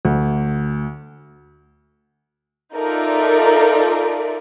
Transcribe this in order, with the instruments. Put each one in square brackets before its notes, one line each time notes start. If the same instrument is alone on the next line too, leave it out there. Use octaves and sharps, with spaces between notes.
[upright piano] D2
[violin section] D#4 F4 A4 A#4 D5 E5